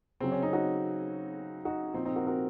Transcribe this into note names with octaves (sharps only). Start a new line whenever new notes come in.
C#3 F#3 C4
C#4
C4 D#4
D#4 F#4
D#4 F#4
A#2 F3 C4 D#4
C4 D#4
F#4 A#4
F#4 A#4